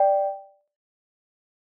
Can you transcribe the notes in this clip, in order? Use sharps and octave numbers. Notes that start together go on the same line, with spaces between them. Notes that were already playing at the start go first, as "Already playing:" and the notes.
Already playing: D5 G5